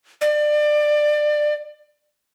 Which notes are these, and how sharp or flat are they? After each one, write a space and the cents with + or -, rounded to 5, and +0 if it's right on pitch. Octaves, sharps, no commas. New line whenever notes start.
D5 +25